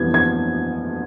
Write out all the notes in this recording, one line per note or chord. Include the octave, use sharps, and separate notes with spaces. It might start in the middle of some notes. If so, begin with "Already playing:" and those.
Already playing: F2 E3 G3 B3 G#6
G#6